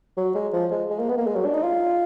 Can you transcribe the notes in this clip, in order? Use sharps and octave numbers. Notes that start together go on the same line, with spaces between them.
F#3
G#3
F3
G#3
G#3
A#3
B3
A#3
G#3
F#3
D4
D#4
F4